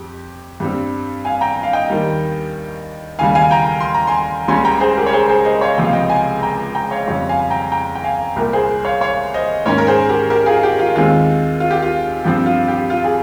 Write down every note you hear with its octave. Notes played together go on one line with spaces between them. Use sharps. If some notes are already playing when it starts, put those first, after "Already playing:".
Already playing: F2 G4
G2 G3 C4
F5 G#5
G5 A#5
F5
D#5 G5
D#2 D#3 G3
D#2 C#3 G3 F5 G#5
F5 G#5
G5 A#5
C6
A#5
G#5 C6
C#2 C#3 G3 C#4 G#5 C6
G5 A#5
G#4 C5
G4 A#4
C#5
G#4 C5
G#4 C5
C5 D#5
C#5 F5
C#2 C3 F3 G5
F5
D#5 G5
F5 G#5
G5 A#5
G5 A#5
C#5 F5
F2 C#3 G3 C#5 F5
F5 G#5
G5 A#5
G5 A#5
G5
F5 G#5
C2 A#2 G3 G4 A#4
G#4 C5
C#5 F5
C#5 F5
C5 D#5
G#2 D#3 A#3 C#4 A#4 C#5
A#4
G#4 C5
G4 A#4
G4 A#4
F4 G#4
G4
F4
D#2 D#3 G#3 C4 F4
F4
G4
F4
G2 F3 C4 G4
F4
G4
F4
G#4